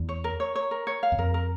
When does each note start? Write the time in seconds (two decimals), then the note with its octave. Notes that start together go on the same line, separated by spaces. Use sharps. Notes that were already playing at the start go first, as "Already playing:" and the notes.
Already playing: E2
0.09 C#5
0.24 A#4
0.40 C#5
0.55 C#5
0.71 A#4
0.87 C#5
1.03 F5
1.12 E2
1.18 F2 A#4
1.34 A#4